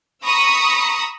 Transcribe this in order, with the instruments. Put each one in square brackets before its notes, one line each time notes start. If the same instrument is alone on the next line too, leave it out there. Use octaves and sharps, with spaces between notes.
[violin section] A#5 B5 C#6 D#6 E6